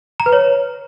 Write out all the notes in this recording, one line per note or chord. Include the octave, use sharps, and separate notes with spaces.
A#5
B4
C#5